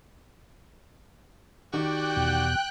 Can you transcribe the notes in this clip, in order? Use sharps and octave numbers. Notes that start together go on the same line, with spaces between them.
D#3 F#4 G4 D5 G5 F#6
E2 B2